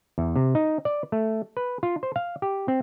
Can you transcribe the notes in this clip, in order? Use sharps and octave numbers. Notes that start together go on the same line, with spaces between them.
E2
C3
D#4
D5
A3
B4
F4
C5
F5
G4
C4